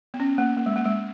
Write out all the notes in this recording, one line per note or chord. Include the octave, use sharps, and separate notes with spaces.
B3
C#4
A#3
A#3
G#3
A#3
G#3